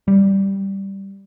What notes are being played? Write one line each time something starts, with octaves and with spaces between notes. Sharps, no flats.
G3